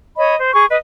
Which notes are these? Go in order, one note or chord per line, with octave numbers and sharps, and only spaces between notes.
C#5 D#5 B5
C5
G#4 C#6
B4 D#5